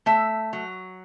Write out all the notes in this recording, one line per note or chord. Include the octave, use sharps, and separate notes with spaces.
A3 E5
F#3